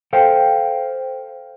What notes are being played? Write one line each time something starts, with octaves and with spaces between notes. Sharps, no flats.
A4 C5 F5 G5